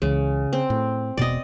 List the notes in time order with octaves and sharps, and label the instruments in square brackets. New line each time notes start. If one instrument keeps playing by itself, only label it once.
[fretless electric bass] C#2 E3 [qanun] C#3
[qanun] C4
[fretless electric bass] A2
[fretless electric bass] E1 B2 B3 [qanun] D5 D#5